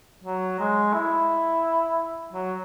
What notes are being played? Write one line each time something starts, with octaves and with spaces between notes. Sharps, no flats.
F#3
G#3
E4
F#3